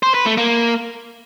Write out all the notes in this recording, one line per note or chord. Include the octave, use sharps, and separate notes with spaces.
C5
B4
A3
A#3